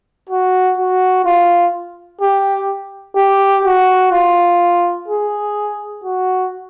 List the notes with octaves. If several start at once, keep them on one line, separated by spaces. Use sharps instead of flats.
F#4
F#4
F4
G4
G4
F#4
F4
G#4
F#4